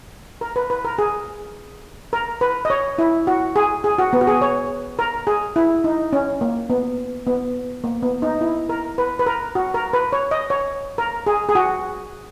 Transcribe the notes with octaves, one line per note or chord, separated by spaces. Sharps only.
A#4
B4
B4
A#4
G#4
A#4
B4
D#5
C#5
E4
F#4
G#4
G#4
F#4
B3
F#4
G#4
C#5
A#4
G#4
E4
D#4
C#4
A#3
B3
B3
A#3
B3
D#4
E4
A#4
B4
B4
A#4
F#4
A#4
B4
C#5
D#5
C#5
A#4
G#4
G#4
F#4